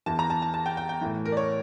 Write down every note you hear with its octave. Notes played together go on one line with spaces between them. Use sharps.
E2 E3 A5
A#5
A5
A5
A5
G5
G5
G5
A2 E3
A#4
D5
C#5